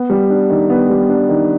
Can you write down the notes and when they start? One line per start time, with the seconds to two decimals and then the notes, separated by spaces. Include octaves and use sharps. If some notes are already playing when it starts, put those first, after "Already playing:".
Already playing: B3
0.10 G3
0.30 D4
0.50 D#3
0.70 B3
0.89 G3
1.09 D4
1.29 D#3